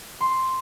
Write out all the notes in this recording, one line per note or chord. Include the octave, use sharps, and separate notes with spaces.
C6